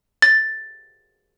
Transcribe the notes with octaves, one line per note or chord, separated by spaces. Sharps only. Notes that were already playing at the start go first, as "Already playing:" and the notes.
A6